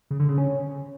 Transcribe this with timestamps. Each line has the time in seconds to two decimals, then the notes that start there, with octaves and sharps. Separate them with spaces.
0.11 C#3
0.20 D3
0.29 C#3
0.38 C#4